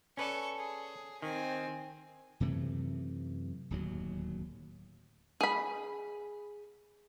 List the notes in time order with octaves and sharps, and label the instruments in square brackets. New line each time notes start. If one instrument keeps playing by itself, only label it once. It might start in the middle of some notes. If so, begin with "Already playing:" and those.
[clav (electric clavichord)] C#4 B4 D5 [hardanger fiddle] A4 C#6
[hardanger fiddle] G#4
[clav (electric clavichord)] D#3 [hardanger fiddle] C4 G#5
[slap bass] F#2 C3 E3 A3
D1 D#2 F#3
[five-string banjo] G#4 B5